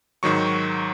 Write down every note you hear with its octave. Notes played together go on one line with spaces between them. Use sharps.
G#2 D#3 F#3 C#6